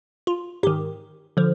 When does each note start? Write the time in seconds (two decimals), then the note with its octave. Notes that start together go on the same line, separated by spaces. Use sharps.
0.27 F4
0.63 G#2 D#3 G4
1.37 D3 F3